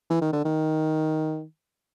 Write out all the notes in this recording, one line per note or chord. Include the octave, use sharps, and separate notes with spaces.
E3
D#3
D3
D#3